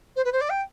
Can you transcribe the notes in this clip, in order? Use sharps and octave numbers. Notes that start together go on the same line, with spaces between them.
C5
B4
C5
D5
G5